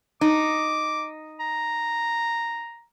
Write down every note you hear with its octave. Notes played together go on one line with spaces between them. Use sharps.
D#4 D6
A#5